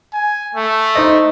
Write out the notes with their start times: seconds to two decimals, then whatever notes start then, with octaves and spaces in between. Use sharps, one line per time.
0.13 G#5
0.55 A3
0.95 D#4 C5 D#5